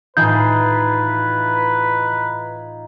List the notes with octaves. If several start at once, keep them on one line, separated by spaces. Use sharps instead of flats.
A2 E3 D#4 F4 G#4 B4 G6